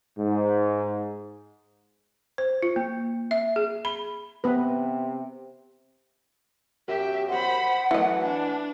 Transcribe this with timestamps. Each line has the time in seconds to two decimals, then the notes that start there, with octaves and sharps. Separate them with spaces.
0.18 G#2
2.38 C5
2.63 F4
2.76 A#3
3.31 E5
3.56 G#4
3.85 B5
4.44 C3 B3 B4
6.88 F#2 G4 E5
7.29 C5 F#5 B5
7.91 E3 F#3 A3 E4 D#5
8.21 D4